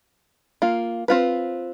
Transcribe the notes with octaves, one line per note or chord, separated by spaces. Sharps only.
A#3 F4
C4 F4 B4